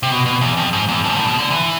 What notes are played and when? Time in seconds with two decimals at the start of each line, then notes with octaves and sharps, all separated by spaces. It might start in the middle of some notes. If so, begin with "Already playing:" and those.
0.03 C3
0.12 B2
0.26 B2
0.41 E2
0.57 F2
0.73 G#2
0.89 E2
1.04 F2
1.09 G#2
1.16 A2
1.27 B2
1.38 D3
1.51 E3